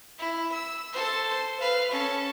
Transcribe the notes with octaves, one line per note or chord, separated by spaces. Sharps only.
E4
E6
A4 C5
C5
B4 F5
C#4 A4